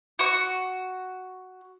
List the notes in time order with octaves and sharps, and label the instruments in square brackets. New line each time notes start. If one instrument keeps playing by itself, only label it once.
[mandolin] F#4 C#6